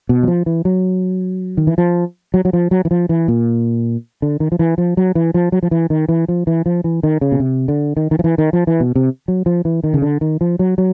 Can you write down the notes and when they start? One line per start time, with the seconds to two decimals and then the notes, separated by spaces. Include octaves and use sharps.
0.09 B2
0.23 F#3
0.28 F3
0.46 E3
0.65 F#3
1.57 D#3
1.67 E3
1.78 F3
2.34 F#3
2.45 F#3
2.53 F3
2.71 F#3
2.85 E3
2.91 F3
3.09 E3
3.28 A#2
4.22 D3
4.40 D#3
4.52 F3
4.59 E3
4.78 F3
4.97 F#3
5.15 E3
5.34 F3
5.52 F#3
5.63 F3
5.71 E3
5.90 D#3
6.09 E3
6.28 F3
6.47 E3
6.66 F3
6.84 E3
7.03 D#3
7.21 C#3
7.32 B2
7.40 C3
7.68 D3
7.97 D#3
8.11 D#3
8.19 F3
8.24 E3
8.38 D#3
8.53 F3
8.67 E3
8.80 B2
8.96 C3
9.28 F#3
9.46 F3
9.65 E3
9.84 D#3
9.94 C#3
10.02 D3
10.21 D#3
10.41 F3
10.59 F#3
10.78 F#3